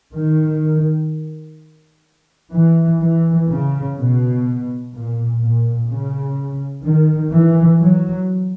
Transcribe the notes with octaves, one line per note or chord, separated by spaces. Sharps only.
D#3
E3
E3
C#3
B2
A#2
A#2
C#3
D#3
E3
F#3